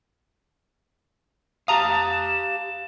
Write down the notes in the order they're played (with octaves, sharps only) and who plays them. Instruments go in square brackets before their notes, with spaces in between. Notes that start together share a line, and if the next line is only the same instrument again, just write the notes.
[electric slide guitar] G4 F5 [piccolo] A5 [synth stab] A#5 D#6
[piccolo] E7